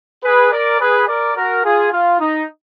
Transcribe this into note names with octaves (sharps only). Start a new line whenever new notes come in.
G#4 B4
A#4 D5
G#4 B4
A#4 D5
F#4 A#4
F4 G#4
F4
D#4